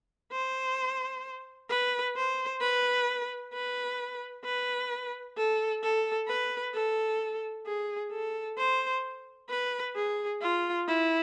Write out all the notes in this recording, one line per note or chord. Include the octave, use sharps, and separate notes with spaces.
C5
B4
C5
B4
B4
B4
A4
A4
B4
A4
G#4
A4
C5
B4
G#4
F4
E4